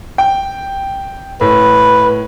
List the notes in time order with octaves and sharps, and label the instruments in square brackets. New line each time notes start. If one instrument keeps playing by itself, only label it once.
[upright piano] G5
[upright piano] A2 [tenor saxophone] B4